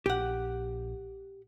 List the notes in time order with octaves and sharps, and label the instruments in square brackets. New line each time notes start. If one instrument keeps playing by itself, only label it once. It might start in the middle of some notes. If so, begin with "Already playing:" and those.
[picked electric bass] A#1 [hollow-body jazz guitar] G4 F#5